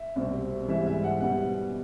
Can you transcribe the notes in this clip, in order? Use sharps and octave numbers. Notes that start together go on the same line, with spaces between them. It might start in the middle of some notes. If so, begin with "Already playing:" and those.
Already playing: E5
C2 B2 G3 C4
G#2 E3 G3 C4 E5
E5
F#5
B2 G3 B3 F#5